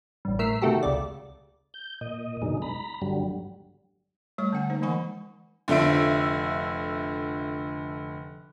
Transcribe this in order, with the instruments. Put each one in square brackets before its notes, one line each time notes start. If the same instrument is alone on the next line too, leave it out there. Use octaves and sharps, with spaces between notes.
[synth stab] A1 G2
A2 A#4 E6 B6 C7
C3 D#3 A3 F#4 G4 A4
C#2 D5
[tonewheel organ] G6
A#2 D#5
F#2 B2 D3 G#3 D#4
A#5 B5
G2 D3 F#3 G3
[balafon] G3 A3 C#5 C#6
D3 C#4 F#5 G#5
A#3 D#4 C5
E3 G#3 F#5 G#5 B5 C#6
[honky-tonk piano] F1 D3 F3 E5 D7